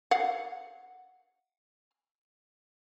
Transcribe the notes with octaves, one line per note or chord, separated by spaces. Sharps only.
F5 F#5